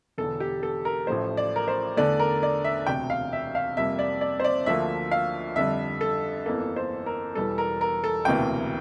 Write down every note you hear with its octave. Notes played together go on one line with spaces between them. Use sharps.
E1 E2 D3 A4
G4
A4
A#4
A1 A2 F3 A3 C5
D5
A#4
C5
E2 D3 A3 D5
A#4
D5
E5
E1 D2 C3 G5
F5
E5
F5
F2 C3 G3 A#3 E5
D5
D5
C5
D5
D2 D3 F3 A#3 E5
F5
F2 D3 G3 E5
A4
G1 F2 E3 A#3 A4
C5
A#4
E1 E2 E3 G3 A4
A#4
A#4
A4
E1 D2 C3 E3 A#3 G5